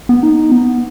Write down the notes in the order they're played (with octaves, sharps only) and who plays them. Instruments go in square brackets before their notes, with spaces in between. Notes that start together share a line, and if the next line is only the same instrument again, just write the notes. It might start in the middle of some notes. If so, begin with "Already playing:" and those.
[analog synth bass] B3
D#4
B3